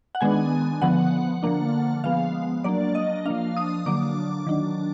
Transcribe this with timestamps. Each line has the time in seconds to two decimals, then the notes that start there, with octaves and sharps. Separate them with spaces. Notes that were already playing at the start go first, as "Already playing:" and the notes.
0.15 F#5
0.21 D#3 G#3 B3 D4 G#5
0.82 D3 F3 B3 F#5
1.43 D3 F3 A#3 D4
2.04 F3 G#3 B3 F5
2.64 F#3 A#3 D4 D5
2.95 D#5
3.25 F3 A#3 D4 F5
3.57 D#6
3.86 D3 F#3 A#3 D4 D6
4.47 D#3 F#3 D4